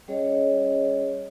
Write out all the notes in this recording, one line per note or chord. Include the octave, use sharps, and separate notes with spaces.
G3 C#4 G#4 C#5 D#5